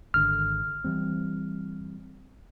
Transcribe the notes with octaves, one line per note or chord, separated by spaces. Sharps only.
G#1 D3 F6
E3 G3 C4